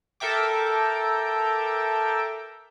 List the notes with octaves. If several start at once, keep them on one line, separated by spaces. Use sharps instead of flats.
A4 A#4 E5 G5 D6